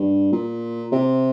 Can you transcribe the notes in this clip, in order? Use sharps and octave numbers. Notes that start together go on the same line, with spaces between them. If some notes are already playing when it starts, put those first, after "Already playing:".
Already playing: G2
A#2
C3